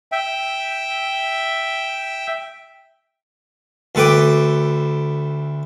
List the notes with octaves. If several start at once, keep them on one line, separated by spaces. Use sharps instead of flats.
E5 G5
D2 A4 B4 G5 D6